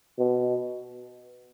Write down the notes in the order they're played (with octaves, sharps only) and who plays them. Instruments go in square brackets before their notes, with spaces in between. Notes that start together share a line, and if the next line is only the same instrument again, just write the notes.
[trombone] B2